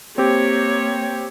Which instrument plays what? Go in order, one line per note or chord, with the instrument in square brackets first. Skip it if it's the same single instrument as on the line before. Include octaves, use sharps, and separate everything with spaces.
[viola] A#3 C#5 [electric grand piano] C4 G4